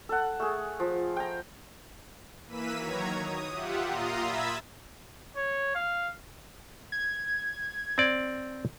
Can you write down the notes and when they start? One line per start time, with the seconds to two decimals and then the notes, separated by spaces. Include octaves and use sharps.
0.09 A4 F#5
0.40 A3 G#4
0.80 F3
1.16 G5 A#5
2.46 E3 A#3 B4 E6 B6 D#7
2.78 D#3 F#3 C#5 A#5 G#6
3.15 D#6
3.50 F4 G4 E5 F#5
3.85 A#2 F4 A#5 C6 D#6
4.21 E5 B5 E6 G#6 A6 B6
5.37 C#5
5.75 F5
6.92 G#6
7.98 C4 D5